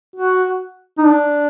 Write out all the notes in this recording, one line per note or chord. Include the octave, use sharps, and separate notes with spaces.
F#4
D#4
D4